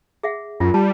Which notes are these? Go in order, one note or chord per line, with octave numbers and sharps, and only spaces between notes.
G#4 E5 F#5
F#2 F4
G3 A5